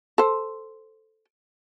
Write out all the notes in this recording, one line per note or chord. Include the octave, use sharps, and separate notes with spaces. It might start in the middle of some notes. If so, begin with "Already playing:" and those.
A4 C5